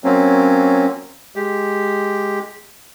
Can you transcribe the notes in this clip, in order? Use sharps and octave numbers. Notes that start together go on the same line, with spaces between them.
F#3 A#3 C4 C#4
G#3 G4